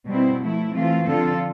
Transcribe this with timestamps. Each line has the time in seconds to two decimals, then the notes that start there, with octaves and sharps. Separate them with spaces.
0.09 B2 G3 C4 E4
0.41 F3 A3 E4
0.75 E3 A3 C4 F4
1.07 D3 F3 C4 F4 A4